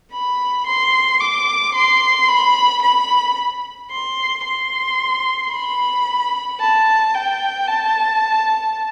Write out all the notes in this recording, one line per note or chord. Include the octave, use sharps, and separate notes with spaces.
B5
C6
D6
C6
B5
B5
C6
C6
B5
A5
G5
A5